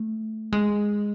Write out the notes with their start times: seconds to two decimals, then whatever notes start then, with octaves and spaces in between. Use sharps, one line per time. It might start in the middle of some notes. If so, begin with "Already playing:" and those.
Already playing: A3
0.52 G#3